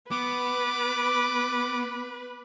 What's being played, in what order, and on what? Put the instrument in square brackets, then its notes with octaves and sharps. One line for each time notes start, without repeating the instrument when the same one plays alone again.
[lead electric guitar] B3 [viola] B4 [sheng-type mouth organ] D6